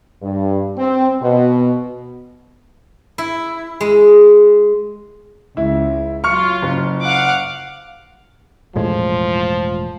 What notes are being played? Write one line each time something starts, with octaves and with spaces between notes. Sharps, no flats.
G2
C4
B2
E4
G#3
C#2 E4
F#3 F4 C#6 F6 C#7
F#1
F5 F#5 D6
E1 A2 F3 G#3